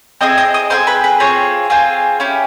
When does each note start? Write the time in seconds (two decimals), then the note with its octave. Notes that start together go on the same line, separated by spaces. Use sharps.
0.21 C4 E4 G#4 D#5 D#6
0.38 D#5 D#6
0.54 D#5 D#6
0.70 C4 E4 G#4 C5 C6
0.87 B4 B5
1.04 B4 B5
1.20 C4 F4 G#4 C#5 C#6
1.70 C4 F4 G#4
2.20 C#4 E4 G4